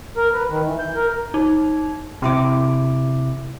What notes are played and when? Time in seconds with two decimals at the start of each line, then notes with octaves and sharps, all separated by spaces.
0.17 A#4
0.33 B4
0.49 D#3
0.65 E3
0.79 G6
0.95 A#4
1.34 D#4
2.22 C3 E4 D6